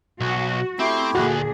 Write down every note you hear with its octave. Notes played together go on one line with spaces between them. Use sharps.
B1 F#4
A3 C4 E4 G4
D2 A#2 D3 F#4 G#4 F#6